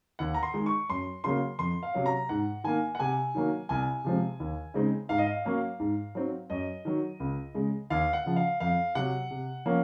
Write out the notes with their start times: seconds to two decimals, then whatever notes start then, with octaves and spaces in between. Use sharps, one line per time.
0.19 D#2 F#5
0.34 A#5
0.43 C6
0.54 D#3 G#3 D#4
0.66 C#6
0.89 F#2 C6
1.24 C#3 F#3 A#3 C6
1.59 F2 C6
1.83 F5
1.94 C3 F#3 C#4
2.06 A#5
2.29 G#2 F#5
2.64 D#3 A#3 G#5
2.95 F#5
3.00 C3 G#5
3.35 D#3 F#3 A#3
3.69 C2 G#5
4.04 C3 F3 G#3 C4
4.40 D#2
4.74 C#3 G#3 C4 D#4
5.09 G#2 F5
5.18 D#5
5.26 F5
5.45 F#3 A#3 C#4
5.80 G#2
6.15 F#3 C4 D#4
6.50 F#2 D#5
6.85 D#3 F#3
7.20 C#2
7.55 C#3 G#3
7.90 D#2 F5
8.13 F#5
8.26 C#3 F3
8.36 F5
8.60 F2 F5
8.95 C3 F#3 F#5
9.30 C3
9.65 F3 A#3 C#4